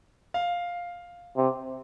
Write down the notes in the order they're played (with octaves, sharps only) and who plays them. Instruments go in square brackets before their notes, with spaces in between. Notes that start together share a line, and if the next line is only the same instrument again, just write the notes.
[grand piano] F5
[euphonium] C3